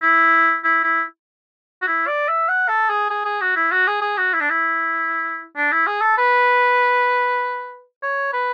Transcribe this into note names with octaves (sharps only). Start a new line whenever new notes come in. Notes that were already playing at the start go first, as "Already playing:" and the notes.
E4
E4
E4
F#4
E4
D5
E5
F#5
A4
G#4
G#4
G#4
F#4
E4
F#4
G#4
G#4
F#4
E4
D4
E4
D4
E4
G#4
A4
B4
C#5
B4